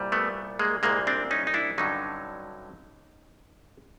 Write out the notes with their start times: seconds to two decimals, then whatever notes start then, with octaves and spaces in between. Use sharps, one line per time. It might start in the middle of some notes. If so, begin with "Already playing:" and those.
Already playing: C2 A#2 G3
0.12 A3 B3
0.59 G#3 A#3
0.83 C2 A#2 G3 G#3 A#3
1.07 C4 D4
1.31 C#4 D#4
1.47 D#4
1.54 D4 E4
1.78 G2 D3 F#3 C#4 D#4